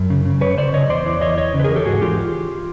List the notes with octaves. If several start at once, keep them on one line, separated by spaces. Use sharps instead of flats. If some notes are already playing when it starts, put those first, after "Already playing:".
Already playing: F#2
C#3
C#3
F#2 B4 C#5
C#3 C5 D5
C#3 C#5 D#5
E2 C5 D5
E3
E2 C#5 D#5
E2 C#5 D#5
C#3
B4
G#4 A#4
E3
G4 A4
G#2 F#4 G#4
E3 F4 G4